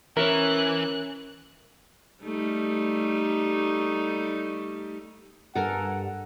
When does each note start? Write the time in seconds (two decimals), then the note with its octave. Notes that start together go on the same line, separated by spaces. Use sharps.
0.17 E3 C#4 A#4 C#5 E5 F#6
2.23 G3 A3 D#4
5.55 G2 A4 A#4 F#5 G#5